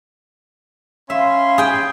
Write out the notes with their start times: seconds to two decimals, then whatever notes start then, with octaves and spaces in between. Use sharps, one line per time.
1.10 C#4 E5 F5 B5 C6
1.58 G#4 G5